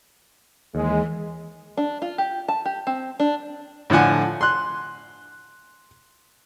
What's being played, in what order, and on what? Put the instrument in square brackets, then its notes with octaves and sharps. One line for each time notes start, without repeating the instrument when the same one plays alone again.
[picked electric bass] D#2 [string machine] E3 [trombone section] G#3
[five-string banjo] D4
F4
G4
A5
G4
C4
D4
[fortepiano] A2 D3 F3 F#5 G#5
C6 F#6